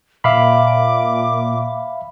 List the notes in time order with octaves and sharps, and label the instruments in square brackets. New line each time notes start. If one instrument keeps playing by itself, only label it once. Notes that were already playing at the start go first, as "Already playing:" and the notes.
[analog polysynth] A#2 [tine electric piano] E5 F5 B5 [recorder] D6